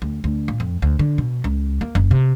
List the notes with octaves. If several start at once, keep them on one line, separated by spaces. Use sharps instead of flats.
D2
D2
A#2
F2
D2
D3
B2
C#2
A#3
F#1
C3